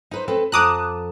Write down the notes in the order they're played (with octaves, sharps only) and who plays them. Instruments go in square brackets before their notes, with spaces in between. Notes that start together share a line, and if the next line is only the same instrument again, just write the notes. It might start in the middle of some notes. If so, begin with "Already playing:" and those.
[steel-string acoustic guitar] D#4 B4 C5
C4 A4 B4
[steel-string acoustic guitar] F2 A5 A#5 [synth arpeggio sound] D6 D#6 F#6